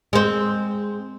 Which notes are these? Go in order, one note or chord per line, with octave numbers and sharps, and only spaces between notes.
G#3 C4